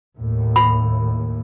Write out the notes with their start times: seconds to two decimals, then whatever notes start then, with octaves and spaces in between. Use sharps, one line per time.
0.18 D#2 A2
0.56 B5